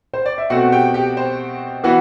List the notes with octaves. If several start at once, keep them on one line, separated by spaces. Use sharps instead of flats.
C5
D5
E5
B2 A3 C4 F#4 F#5
G4 G5
G4 G5
C5
E3 B3 F#4 F#5